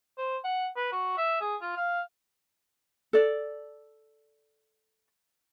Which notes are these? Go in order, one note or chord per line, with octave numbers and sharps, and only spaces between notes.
C5
F#5
B4
F#4
E5
G#4
F4
F5
A4 D5